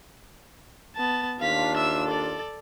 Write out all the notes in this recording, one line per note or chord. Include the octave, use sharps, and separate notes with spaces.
B3 A5
D#2 D4 F4 F5 B6
E5 E6
A4 D5